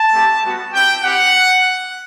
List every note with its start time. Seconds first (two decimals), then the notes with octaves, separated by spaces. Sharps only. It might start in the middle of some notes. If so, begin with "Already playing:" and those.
Already playing: A5
0.13 A3 C4 E4 G4
0.43 G3 B3 F#4
0.74 C4 E4 G4 G5
1.04 C4 E4 G4 F#5